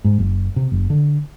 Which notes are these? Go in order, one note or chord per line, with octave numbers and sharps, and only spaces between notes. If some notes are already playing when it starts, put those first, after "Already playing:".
G#2
F#1
C3
F#1
D3